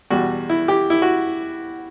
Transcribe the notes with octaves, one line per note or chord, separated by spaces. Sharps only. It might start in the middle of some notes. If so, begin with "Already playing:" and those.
E2 B2 G3 F#4
E4
G4
E4
F#4